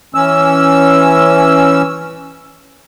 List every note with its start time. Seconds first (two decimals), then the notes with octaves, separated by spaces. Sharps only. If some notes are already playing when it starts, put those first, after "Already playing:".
0.15 E3 C#4 E6